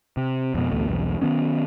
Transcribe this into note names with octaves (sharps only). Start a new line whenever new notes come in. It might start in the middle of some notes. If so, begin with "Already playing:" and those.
C3
F2 B2
A1 D2 B2 A3
B1 E2 G2
D#3 B3 C#4